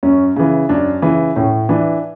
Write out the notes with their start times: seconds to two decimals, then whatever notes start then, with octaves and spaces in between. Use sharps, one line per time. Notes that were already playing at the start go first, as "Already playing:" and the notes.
0.03 F#2 C#4
0.36 C#3 E3
0.69 F#2 D4
1.02 C#3 E3
1.36 A2 C#4
1.69 E3 D4